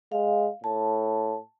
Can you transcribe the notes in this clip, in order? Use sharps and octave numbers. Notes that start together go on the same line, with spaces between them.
G#3 F5
A2 A5